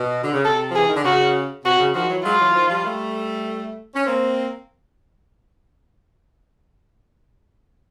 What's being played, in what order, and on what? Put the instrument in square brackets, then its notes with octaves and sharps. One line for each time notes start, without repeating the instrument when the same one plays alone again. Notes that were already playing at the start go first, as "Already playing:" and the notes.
Already playing: [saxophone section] B2
D3
C#3
[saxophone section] C3 [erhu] A4
[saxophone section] F3
[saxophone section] E3 [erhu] G#4
[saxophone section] D#3
D3
[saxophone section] C#3 [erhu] F#4
[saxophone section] C3 [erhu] F#4
[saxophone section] C#3
[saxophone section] D#3 F3 [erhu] F#4
[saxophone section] E3 F#3
[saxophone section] F#3 G#3 [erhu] F4
[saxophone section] E3 F#3
D#3 F3
F3 G3
G3 A3
C#4
A#3 C4